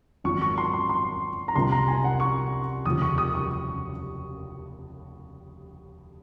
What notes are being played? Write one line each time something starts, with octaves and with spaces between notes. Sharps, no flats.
G#1 F#2 F3 C#6
C#6
C6
C6
C6
A#5
C2 C3 F3 C6
A#5
G#5
F#5
C#6
F1 D#2 C#3 F3 D#6
C#6
D#6
C#6